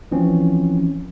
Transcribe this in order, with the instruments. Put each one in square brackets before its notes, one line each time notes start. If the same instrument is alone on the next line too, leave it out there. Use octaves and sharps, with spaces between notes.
[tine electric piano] E3 F3 C4 C#4